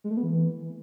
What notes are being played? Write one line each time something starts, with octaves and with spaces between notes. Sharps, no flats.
G#3
A3
B3
E3